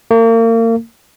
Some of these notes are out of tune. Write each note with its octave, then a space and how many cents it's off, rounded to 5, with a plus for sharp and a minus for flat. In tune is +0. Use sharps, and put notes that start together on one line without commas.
A#3 -35